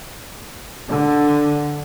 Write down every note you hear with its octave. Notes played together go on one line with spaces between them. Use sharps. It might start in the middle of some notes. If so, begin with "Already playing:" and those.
D3